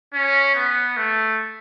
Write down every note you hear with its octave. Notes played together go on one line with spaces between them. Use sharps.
C#4
B3
A3